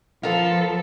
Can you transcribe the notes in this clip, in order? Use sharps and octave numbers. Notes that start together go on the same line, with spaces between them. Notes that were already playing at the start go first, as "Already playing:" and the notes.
F3 B3 A4 A#4 F5